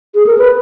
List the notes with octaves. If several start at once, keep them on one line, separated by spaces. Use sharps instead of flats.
G#4
A#4
B4